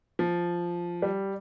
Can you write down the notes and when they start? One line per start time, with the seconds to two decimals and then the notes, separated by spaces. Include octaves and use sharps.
0.19 F3
1.02 G3